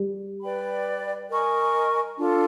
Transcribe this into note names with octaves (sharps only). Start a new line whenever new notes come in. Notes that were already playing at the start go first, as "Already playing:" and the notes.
Already playing: G3
B4 D5 G5 B5
A#4 D#5 G#5 C#6
D4 F4 A4